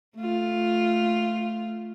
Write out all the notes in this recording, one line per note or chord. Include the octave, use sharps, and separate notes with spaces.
A3 F4